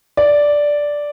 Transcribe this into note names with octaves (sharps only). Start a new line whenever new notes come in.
D5